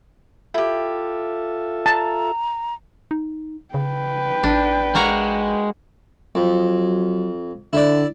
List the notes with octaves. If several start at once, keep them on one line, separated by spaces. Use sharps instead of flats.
E4 F4 G4 A4 E5
A5 A#5
D#4
C#3 B4 G5
A1 D4
G#3 A#3 F#4 A#5
F2 F#3
D3 E4 D5